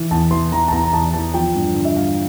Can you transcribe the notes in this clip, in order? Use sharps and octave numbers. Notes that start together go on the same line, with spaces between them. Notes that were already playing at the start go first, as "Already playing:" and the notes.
Already playing: E3
E2 A5
E3 C6
E3 A#5
A5
E2 A#5
A#5
E2 A5
E3 A5
F3 G5
G2
D3
E5
G2 F5